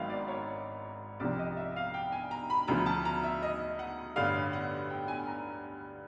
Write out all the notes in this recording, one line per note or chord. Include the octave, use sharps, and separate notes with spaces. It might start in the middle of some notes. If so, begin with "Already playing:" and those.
Already playing: G#1 G#2 D#3 F#3 E5 F5
D5
C#5
C2 C3 F3 D5
D#5
E5
F5
G5
G#5
A#5
B5
D2 C#3 F3 A#5
A5
A#5
E5
D#5
F#5
A1 G2 D3 F5
F#5
G5
G#5
A#5